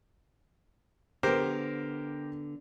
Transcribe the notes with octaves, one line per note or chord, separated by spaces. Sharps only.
D3 B3 G4 A#4 C5